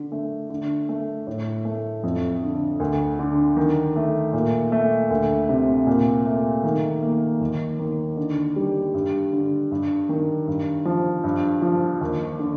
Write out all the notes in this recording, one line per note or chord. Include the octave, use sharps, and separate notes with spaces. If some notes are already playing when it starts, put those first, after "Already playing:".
Already playing: D3
A3
D3
A3
A2
A3
F2
D3
D2
D3
D#3
A3
A#2
A3
D2
C3
A#2
A3
D#3
A#3
D#2
D#3
D3
G3
G2
D3
G2
D#3
G2
F3
G2
F3
D#2
D3